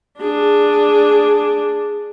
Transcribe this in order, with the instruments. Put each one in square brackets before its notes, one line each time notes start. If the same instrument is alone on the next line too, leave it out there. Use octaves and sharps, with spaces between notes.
[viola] D4 G#4